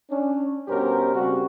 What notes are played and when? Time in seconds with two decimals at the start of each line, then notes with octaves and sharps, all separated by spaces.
0.10 C#4 D4
0.68 G2 B2 C#4 G4 A#4 C5
1.14 C#3 G3 C4 C#4 F#4